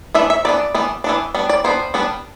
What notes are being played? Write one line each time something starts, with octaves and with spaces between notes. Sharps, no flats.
E3 B3 D4 E5
E5
E3 B3 D4 D5
E3 B3 D4
E3 B3 D4
G3 B3 D4
D5
G3 B3 D4 C5
G3 B3 D4